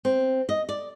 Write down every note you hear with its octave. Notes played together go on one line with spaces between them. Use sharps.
C4
D#5
D5